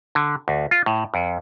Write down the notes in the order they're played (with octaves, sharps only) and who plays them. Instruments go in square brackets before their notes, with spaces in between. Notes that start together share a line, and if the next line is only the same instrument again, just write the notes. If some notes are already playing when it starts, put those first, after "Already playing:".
[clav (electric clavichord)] D3
D2
F4
A2
F2